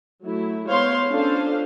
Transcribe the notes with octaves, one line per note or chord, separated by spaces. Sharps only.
F#3 A3 E4
G#3 B3 C5 C#5 F5 C6
C#4 D4 F4 A4 C5 F5